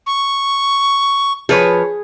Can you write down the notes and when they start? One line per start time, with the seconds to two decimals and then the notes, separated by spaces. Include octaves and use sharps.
0.07 C#6
1.49 F3 G#4 B4 C#5